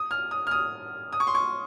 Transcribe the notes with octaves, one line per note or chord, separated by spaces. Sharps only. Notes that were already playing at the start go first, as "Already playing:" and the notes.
Already playing: D#6
F6
D#6
F6
D#6
D#6
C#6
C6
C#6